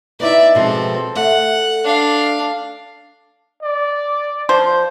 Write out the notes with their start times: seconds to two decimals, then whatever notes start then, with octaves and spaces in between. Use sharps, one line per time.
0.20 B3 D#4 E4 D5 E5
0.55 B2 F3 G#3 C4 A4
1.16 A3 F#5
1.85 D4 F5
3.63 D5
4.49 F3 C5